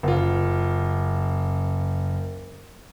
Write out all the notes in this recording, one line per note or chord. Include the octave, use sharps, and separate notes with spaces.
F#1 F4